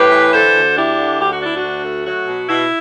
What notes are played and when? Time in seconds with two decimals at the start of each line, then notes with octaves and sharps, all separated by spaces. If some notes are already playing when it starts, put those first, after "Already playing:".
Already playing: A2 G4 B4
0.11 E3
0.33 D3 A4 C5
0.55 D2
0.77 D4 E4 G4
0.97 D3
1.19 D2 G4
1.32 F#4
1.41 D4 E4
1.57 F#4
1.63 D2
1.85 A3
2.06 F#3 F#4
2.28 B2
2.49 B2 E4